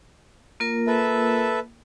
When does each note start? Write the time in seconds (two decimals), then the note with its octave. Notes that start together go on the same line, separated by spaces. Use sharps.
0.60 A#3 F4 A#4
0.87 A4 B4 E5